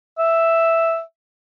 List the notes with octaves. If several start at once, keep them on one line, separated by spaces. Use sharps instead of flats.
E5